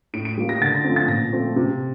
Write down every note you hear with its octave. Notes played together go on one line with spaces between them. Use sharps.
A2 D7
D7
G3 A#3
A#6
D3 A6
A#6
F3 A3 C4
A6
A#2 A#6
F3 A3 C4
C3